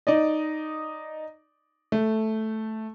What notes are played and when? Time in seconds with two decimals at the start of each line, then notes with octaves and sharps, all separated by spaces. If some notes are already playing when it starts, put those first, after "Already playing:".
0.07 D#4 D5 D#5
1.92 A3